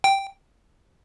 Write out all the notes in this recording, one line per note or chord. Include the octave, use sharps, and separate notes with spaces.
G5